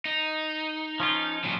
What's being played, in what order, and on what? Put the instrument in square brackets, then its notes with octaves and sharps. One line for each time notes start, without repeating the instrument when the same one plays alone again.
[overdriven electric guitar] D#4
[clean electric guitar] F3 C#4 F4
[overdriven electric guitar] A#2 F#3